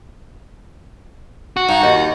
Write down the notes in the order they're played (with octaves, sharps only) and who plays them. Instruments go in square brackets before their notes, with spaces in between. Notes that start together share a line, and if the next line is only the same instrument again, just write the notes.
[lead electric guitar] F#4
[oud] G2 [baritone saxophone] D#4
[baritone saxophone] D#2 [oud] D#5